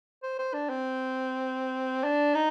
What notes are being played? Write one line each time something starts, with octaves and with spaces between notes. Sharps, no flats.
C5
C5
D4
C4
D4
D#4